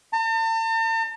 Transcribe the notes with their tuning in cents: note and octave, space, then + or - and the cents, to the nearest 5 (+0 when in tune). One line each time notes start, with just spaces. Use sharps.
A5 +45